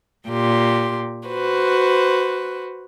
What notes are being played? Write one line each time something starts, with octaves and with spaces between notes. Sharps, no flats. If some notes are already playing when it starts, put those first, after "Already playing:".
A#2 G4 C6
F#4 B4 C5